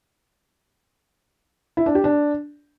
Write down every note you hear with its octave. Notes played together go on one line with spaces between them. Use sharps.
E4
D4
G4
D4